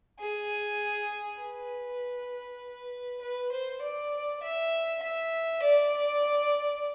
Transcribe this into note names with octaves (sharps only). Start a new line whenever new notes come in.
G#4
B4
B4
C5
D5
E5
E5
D5